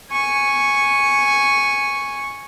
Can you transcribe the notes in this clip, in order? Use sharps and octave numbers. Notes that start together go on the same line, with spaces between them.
G#5 C#6